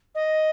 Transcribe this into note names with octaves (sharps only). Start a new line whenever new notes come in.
D#5